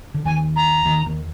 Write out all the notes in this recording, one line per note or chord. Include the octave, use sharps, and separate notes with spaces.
D3
D#2 D#3 G#5
A#5
D#2 D#3
D#2 D#3